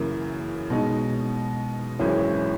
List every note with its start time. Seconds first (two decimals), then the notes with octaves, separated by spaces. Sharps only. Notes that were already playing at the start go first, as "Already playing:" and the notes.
Already playing: F#2 C#3 E3 A#3
0.70 B2 G#3 D#4
1.99 G#1 F#2 E3 G#3 C#4